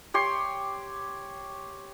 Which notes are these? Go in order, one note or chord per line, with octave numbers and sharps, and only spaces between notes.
G4 C#5 C6